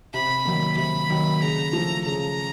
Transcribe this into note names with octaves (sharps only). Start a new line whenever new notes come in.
C3 B5
D#3 F#3 A#3
C3 B5
D#3 F#3 A#3
C#3 A#5
F3 A3
C#3 A#5